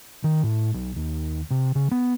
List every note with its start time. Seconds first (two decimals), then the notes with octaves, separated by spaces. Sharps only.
0.24 D#3
0.43 A2
0.74 B1
0.96 D#2
1.51 C3
1.75 C#3
1.91 B3